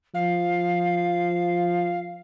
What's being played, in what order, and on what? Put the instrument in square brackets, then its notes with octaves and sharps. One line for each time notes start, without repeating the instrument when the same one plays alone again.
[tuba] F3 [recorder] F5